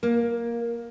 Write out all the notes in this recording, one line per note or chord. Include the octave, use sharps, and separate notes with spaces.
A#3